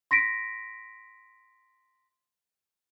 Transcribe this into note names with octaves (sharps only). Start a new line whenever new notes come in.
C6 A#6 B6 D7